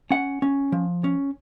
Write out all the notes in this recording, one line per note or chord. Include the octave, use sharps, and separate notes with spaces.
C#4 F#5
C#4
F3
C#4